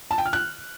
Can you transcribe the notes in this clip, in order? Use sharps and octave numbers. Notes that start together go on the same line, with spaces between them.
A5
G5
F6
F#6